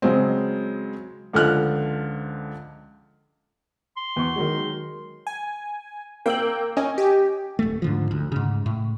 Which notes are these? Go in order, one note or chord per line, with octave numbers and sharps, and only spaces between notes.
C#3 F#3 G#3 C4
C#2 D3 F3 F6 F#6
C6
E2 C#6
D#3 F#3 G#3
G#5
A#3 G5 E6 F#7
C#4 D#5 G#5
G4
D1 A3
G#2 D3 F3
D2
G#2 C#3
A2